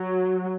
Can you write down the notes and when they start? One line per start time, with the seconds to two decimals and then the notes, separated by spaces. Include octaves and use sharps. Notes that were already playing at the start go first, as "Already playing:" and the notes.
Already playing: F#3